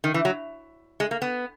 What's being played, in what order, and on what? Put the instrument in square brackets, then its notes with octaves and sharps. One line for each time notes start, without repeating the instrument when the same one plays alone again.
[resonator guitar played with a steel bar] D#3
E3
F#3
G#3
A#3
B3